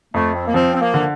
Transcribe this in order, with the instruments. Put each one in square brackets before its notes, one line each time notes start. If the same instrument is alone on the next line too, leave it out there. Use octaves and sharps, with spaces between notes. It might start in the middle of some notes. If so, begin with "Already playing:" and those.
[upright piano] F2 [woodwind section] A3
[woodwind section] C4
A#3
[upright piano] F3 [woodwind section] C4
[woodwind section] C4
A#3
[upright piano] D3